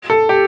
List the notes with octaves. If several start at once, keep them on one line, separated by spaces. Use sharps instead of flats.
A4
G4